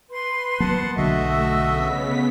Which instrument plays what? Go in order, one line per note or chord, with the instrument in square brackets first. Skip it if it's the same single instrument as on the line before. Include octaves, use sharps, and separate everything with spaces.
[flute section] B4 C6
[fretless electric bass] F#3 A#3 [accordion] B3 F#5 A5
[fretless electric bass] B1 D3 F#3 [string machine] A3 [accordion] F#4 D#5 E5
[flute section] E6
[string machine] C#3 B3 B6